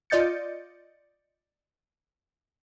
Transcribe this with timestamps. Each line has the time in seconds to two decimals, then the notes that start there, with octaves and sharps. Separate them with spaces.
0.10 F4 D5 D#5 G6 A6 C#7